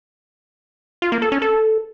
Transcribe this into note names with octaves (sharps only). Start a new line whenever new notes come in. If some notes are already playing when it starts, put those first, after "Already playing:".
F4
A#3
A4
C#4
A4